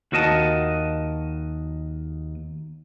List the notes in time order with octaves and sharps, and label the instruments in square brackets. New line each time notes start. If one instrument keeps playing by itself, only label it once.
[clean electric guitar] D#2 F#4 A#4 D#5 A5